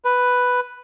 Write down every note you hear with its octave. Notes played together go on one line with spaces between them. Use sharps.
B4